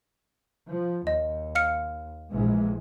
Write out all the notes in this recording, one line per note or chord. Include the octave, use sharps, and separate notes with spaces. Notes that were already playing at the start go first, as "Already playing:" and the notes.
F3
D#2 D#5
F5 F6 C#7
A#1 E3 G#3